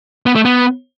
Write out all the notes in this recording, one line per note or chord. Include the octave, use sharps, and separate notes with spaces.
B3
A3
B3